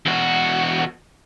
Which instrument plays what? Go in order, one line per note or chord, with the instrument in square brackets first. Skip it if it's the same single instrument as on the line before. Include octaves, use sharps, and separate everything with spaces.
[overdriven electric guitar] E2 F#4